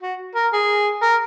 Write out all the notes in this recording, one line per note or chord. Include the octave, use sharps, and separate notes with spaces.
F#4
A#4
G#4
A#4